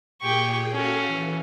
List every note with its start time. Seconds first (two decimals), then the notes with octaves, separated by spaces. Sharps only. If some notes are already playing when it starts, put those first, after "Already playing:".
0.21 A#2 G4 G#4 G5 C#6
0.73 C#4 F#4 A4 F5
1.08 E3